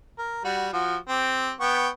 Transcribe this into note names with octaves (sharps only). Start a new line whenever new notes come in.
A#4
G3 F#4
F3 F#4
C4 G4
B3 G5 C#6